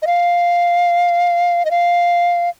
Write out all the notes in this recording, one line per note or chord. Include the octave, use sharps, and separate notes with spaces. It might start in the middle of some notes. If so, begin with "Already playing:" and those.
D#5
F5
D#5
F5